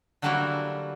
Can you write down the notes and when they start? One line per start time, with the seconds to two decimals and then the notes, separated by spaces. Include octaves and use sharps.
0.22 D3 F#3 G3 A#3 E4 F#4